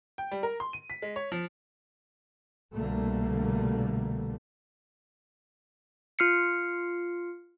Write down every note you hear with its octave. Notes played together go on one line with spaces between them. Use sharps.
G5
G3
A#4
C6
D#7
B6
G#3
C#5
F3
C2 B2 D3 G3 A3 A#3
F4 F6 C7 C#7